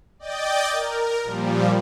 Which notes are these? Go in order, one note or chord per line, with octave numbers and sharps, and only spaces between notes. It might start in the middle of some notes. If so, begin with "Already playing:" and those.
D5 D#5 G5 G6 A6
A#4
A#2 F3 G3